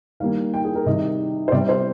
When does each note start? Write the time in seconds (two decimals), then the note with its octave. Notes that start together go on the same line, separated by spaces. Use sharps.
0.20 D#3 G3 A#3 F5
0.54 G5
0.65 G#4
0.75 A#4
0.86 C3 D#3 G3 D#5
1.48 C5
1.52 C3 G3 C4 D5
1.69 C5